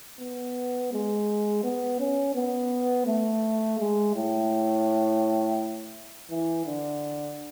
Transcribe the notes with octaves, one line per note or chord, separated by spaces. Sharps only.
B3
G#3
B3
C#4
B3
A3
G#3
A2
E3
D3